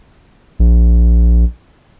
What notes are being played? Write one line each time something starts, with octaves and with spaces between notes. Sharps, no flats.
A#1